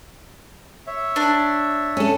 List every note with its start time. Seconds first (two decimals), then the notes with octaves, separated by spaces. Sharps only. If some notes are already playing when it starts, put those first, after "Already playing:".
0.87 C#5 E5
1.16 D4
1.97 C#4 A4